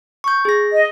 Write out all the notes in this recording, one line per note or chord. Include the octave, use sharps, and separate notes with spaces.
C#6 G6
G#4 A#6
D#5